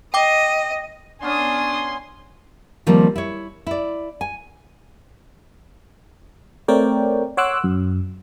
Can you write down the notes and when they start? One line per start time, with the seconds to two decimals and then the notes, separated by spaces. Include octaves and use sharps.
0.14 D#5 G5 D6
1.23 B3 C#4 D4 G#5 C6 D#6
2.87 D#3 F3 G3 A#3 C4
3.16 E4 C#5
3.67 E4 D5
4.21 G#5
6.68 A3 C4 A#4 C#5 D5 G5
7.37 C#5 F#5 C6 D6 E6 F#6
7.64 F#2